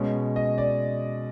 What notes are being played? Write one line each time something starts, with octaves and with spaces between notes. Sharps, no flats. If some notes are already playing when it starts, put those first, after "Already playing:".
Already playing: B2 G#3 C#4
D#5
D5